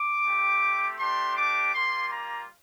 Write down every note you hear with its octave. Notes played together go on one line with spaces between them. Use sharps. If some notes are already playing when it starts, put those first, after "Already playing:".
Already playing: D6
A3 C4 G4
A3 D4 G4 C6
D6
G3 A#3 F4 C6
A#5